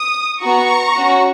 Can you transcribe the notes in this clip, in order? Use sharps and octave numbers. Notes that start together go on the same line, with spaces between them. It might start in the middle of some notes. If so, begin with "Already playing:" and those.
Already playing: D#6
B3 F#4 A#5 C#6
C#4 F#4